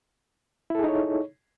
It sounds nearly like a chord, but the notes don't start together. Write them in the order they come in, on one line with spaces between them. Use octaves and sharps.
E4 A4 G#4 D#4 C#5